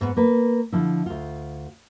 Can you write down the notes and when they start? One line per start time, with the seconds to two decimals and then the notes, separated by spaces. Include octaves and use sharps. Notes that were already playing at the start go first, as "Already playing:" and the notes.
0.01 G#2 B3
0.17 A#3 B4
0.72 D3 F3 E4
1.06 D2 F4